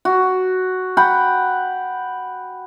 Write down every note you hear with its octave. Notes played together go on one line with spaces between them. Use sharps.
F#4
F#5 G5 B5